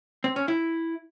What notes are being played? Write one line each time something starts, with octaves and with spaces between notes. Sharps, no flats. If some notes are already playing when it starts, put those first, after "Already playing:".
C4
C#4
E4